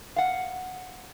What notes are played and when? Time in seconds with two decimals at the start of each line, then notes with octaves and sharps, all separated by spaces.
0.16 F5 F#5